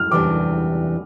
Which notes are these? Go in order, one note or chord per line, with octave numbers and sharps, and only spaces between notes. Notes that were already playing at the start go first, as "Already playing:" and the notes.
Already playing: F6
E2 C3 E3 G3 D4 D6